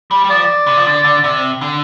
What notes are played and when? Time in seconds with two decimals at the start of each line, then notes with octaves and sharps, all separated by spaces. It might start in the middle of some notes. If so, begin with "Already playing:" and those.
0.11 G3
0.24 G3
0.30 F3 D5
0.67 C3
0.77 F3
0.86 D3
1.04 D3
1.24 C3
1.61 D3